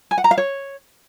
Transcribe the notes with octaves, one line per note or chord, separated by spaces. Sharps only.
G#5
F#5
A#5
F5
C#5